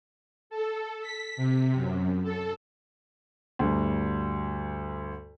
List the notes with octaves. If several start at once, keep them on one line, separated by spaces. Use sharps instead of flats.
A4
B6
C3
F#2
A4
D2 G2